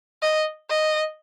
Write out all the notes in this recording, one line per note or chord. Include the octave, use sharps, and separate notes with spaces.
D#5
D#5